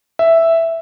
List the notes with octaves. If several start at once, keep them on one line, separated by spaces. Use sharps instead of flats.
E5